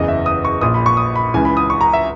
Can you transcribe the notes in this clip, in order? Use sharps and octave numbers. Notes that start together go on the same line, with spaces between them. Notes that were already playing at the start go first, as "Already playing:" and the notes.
Already playing: F#1 E2 C#3 E3 D#5
E5
D#6
C#6
A#1 A#2 D#6
B5
C#6
D#6
B5
C#2 C#3 E3 G#5
B5
D#6
C#6
A#5
E5